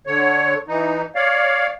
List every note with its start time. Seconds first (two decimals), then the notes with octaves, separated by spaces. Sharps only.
0.07 D3 C#5
0.68 E3 D#4
1.15 C#5 D5 F5